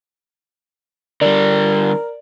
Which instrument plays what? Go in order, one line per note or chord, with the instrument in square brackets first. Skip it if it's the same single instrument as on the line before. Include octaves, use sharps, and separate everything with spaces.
[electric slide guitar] D3 G3 [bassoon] A#4 [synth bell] D5